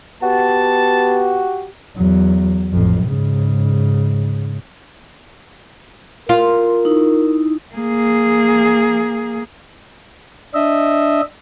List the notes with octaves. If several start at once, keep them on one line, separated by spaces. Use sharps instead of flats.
B3 F#4 G4 A5
E2 F#3
A1 F2
G#2 C#3
F4 A#4
D#4 E4
A#3 G#4
D4 D#5 E5